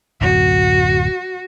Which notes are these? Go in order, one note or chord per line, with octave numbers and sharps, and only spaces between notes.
D1 F#2 F#4